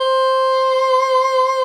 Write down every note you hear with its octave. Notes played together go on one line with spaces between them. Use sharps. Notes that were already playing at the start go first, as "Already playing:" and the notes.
C5